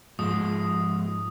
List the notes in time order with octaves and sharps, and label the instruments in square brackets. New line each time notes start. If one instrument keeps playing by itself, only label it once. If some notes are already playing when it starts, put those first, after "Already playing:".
[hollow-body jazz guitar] G#2 [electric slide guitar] F3 G#3 [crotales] D#6